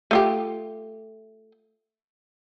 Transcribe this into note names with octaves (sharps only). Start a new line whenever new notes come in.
A3 F4 G4